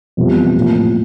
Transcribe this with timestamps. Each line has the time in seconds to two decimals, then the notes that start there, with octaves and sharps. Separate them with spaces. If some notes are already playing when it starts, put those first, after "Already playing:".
0.17 F2 C3 E3 G3 B3
0.55 A2 F3 A#3